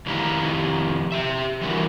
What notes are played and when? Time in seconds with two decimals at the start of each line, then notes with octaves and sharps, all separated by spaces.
0.06 F2 D#3 E4 G4 F5 A#5
1.12 G4 E5
1.61 E3 G3 E4 F#4 A#4